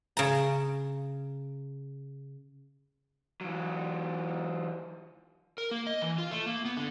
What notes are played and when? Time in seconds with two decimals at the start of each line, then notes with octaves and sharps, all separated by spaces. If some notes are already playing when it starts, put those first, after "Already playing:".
0.17 C#3 A#5
3.41 E3 F#3
5.58 A#4
5.71 A#3
5.87 D#5
6.02 E3
6.18 F4
6.31 A3
6.46 A#3
6.65 B3
6.77 D3